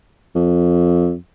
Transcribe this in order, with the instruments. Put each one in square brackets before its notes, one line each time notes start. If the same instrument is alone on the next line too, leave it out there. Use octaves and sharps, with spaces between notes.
[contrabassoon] F2